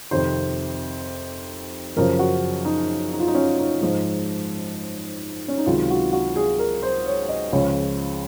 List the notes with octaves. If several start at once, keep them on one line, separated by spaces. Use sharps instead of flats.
F2 C3 D#3 C5
F#2 C#3 F3 A#4
F#4
D#4
D#4
F4
D#4
C#4
D#4
G#2 F3 G#3 D#4
C#4
D#4
C#2 C3 D#3 F#3 F4
F#4
F#4
G#4
A#4
C5
C#5
D#5
C#2 C#3 F3 C#5